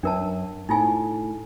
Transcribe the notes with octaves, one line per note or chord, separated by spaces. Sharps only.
F#2 D4 A#4 A5
A2 D#4 F4 G#5